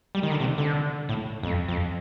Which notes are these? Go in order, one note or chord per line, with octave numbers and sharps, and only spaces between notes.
G3
D#3
D3
C3
D3
A2
F2
F2